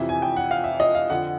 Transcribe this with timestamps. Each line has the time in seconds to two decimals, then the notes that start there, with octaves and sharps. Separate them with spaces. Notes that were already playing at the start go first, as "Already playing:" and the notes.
Already playing: F2 C3 E3 E5
0.09 G#5
0.22 G5
0.36 F#5
0.51 F5
0.64 E5
0.80 D#5
0.95 F5
1.10 F2 D3 F#5